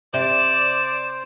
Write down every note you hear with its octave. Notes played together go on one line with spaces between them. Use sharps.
C3 C5 D5 E7